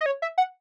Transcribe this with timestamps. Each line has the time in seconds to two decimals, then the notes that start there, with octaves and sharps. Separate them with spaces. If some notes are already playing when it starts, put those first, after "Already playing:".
0.01 D#5
0.06 C#5
0.22 E5
0.38 F#5